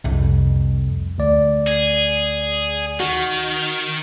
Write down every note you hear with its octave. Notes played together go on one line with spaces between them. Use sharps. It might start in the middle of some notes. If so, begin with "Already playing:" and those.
C2 F2
D2 D5
G#4
D#3 F#4